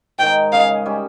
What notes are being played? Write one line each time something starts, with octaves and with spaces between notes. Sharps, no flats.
G#2 D#3 G#3 G5
C#3 G#3 C#4 G#4 F5
G3 C#4